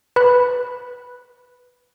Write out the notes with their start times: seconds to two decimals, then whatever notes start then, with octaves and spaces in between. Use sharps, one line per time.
0.16 B4 B5 F#6